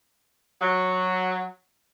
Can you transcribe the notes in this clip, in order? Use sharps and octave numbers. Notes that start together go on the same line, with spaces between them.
F#3